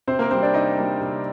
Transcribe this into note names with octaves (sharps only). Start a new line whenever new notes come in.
C3 C4 C5
A#3 A#4
G3 A#3 C4 C5
D4 D5
C3 D#4 D#5
G3 A#3
C3